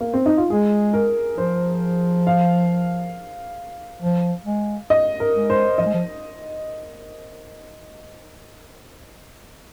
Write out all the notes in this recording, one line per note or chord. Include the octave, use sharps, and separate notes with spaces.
A#3
C4
D#4
F4
G#3 G#4
A#4
F3 C5
F5
F3
G#3
D#5
A#4
G#3
C5
F3 D#5
G#3
F3